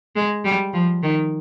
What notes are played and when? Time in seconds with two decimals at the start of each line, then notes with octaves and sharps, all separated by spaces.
0.16 G#3
0.45 G3
0.73 F3
1.03 D#3